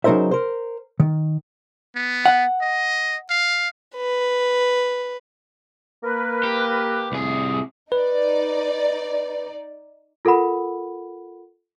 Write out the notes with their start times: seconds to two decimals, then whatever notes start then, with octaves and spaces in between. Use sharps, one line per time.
0.04 C#3 F#3 D#4 A#4 C5 E5
0.31 A#4 C5
1.00 D#3
1.96 B3
2.26 F#5
2.61 D#5
3.30 F5
3.95 B4
6.04 A#3 A#4 B4
6.43 G4
7.12 C2 G#4
7.92 D#4 B4 D5
10.25 F4 A4 A#4 F#5 B5